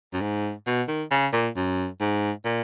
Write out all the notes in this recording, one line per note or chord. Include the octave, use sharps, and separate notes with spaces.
F#2
G#2
B2
D#3
C#3
A#2
F#2
G#2
A#2